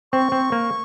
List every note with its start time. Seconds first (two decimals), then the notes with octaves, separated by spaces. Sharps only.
0.12 C4 C#6
0.32 C4
0.52 A#3